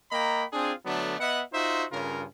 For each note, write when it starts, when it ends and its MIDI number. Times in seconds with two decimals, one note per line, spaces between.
0.12 0.44 58
0.12 0.44 75
0.12 0.44 79
0.12 0.44 82
0.12 0.44 83
0.53 0.73 60
0.53 0.73 62
0.53 0.73 65
0.53 0.73 68
0.85 1.17 50
0.85 1.17 54
0.85 1.17 57
0.85 1.17 59
0.85 1.17 62
1.19 1.42 59
1.19 1.42 75
1.19 1.42 76
1.19 1.42 78
1.53 1.85 63
1.53 1.85 65
1.53 1.85 66
1.53 1.85 72
1.53 1.85 76
1.91 2.24 43
1.91 2.24 49
1.91 2.24 61
1.91 2.24 65
1.91 2.24 70